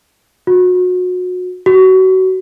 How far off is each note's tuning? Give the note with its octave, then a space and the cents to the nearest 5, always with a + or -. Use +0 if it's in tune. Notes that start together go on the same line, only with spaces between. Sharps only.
F#4 -30
F#4 +25